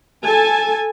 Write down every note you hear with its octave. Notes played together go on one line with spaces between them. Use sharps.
A4 G#5 A5